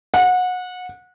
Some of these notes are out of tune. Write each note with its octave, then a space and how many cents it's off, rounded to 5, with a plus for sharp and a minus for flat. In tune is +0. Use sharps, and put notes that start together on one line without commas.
F#5 -25